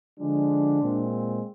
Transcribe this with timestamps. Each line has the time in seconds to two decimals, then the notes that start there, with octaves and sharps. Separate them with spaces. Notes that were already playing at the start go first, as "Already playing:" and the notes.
0.19 D3 F3 G#3 D4
0.81 A#2 G#3 C4